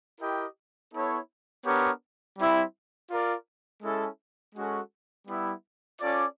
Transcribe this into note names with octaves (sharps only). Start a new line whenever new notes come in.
E4 G4 A#4 D#5 G5
B3 E4 A4 C#5
B3 D4 G4 A#4 C#5
G3 C4 E4
F4 A#4 D5
G#3 C#4 E4 A4
G#3 C#4 F#4 A4
G3 B3 E4
C#4 F4 A4 D5